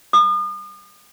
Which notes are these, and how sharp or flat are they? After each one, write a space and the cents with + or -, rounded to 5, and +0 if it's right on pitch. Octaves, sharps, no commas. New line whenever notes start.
D#6 -40